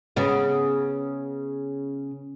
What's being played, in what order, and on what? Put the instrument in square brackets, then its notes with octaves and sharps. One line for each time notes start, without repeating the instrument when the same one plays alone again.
[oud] C#3 B3